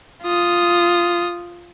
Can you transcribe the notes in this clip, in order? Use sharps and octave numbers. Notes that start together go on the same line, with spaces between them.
F4 D#6